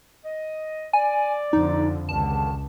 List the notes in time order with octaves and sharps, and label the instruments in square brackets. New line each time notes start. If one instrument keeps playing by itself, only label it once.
[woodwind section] D#5
[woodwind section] D5 [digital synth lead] G#5
[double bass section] F2 D3 [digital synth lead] D#4
[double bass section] C#2 [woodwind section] G2 D3 D#3 [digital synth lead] A5